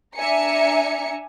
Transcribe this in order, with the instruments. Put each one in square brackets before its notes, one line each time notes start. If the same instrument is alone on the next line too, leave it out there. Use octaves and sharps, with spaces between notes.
[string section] D4 E5 G#5 A#5 C#7